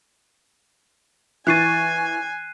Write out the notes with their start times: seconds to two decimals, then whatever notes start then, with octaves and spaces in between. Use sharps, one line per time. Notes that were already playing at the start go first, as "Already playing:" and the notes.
1.47 E3 G#5 C#6 F#6 A6 C7 D#7